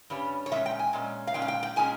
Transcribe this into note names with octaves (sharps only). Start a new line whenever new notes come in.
G2 G3 C#4
C#5
A#2 G#3 C#4 E5
G5
G#5
A#2 G#3 C#4
F5
A#2 G#3 C#4 G5
F5
G5
G5
A#2 G#3 C#4 G#5